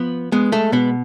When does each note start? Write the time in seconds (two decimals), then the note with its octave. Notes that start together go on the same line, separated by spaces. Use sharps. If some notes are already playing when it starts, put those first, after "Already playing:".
Already playing: F3 B3
0.32 G#3 B3
0.52 A3
0.72 B2 B3